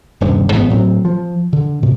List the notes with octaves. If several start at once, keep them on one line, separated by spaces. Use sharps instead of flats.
D#1 G2 C3
A1 G#2 B3
A2 F#3 C4
F3
D3
A2 C3